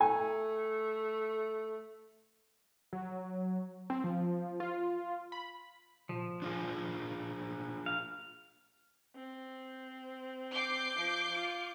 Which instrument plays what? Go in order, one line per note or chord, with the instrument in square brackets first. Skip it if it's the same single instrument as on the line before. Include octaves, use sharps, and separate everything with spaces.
[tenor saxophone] A3 [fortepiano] G#5
[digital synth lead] F#3
C4
F3
F4
B5
[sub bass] A#2 [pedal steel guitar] F3
[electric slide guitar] D4 F4 G#4
[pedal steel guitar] F5
[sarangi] C4
[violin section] D6 G6 C7
[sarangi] F3
F4